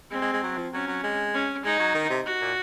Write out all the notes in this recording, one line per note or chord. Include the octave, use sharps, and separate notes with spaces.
G#3 C4
G#3
G#3
F#3
F3
F#3 C#4
F#3
G#3
C#4
G#3 D#4
F#3
D#3
C3
F#4
A#2